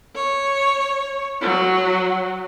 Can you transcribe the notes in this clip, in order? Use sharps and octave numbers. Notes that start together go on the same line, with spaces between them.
C#5
F#3